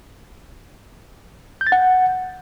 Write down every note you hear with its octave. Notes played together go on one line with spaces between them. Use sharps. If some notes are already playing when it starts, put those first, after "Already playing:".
G6
A6
F#5